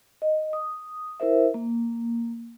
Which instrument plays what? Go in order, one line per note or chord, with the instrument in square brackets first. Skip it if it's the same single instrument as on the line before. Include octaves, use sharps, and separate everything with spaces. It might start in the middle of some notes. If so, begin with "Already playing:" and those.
[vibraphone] D#5
D#6
E4 A#4 C5 E5
A#3